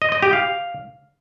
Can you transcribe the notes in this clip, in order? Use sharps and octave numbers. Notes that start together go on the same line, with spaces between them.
D#5
D#5
G4
F5